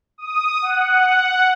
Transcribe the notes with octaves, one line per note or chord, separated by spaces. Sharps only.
D#6
F#5